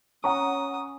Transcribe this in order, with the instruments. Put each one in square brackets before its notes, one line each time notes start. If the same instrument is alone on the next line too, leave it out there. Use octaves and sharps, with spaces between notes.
[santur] C#4 [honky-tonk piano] F#5 A#5 C#6 [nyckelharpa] D#6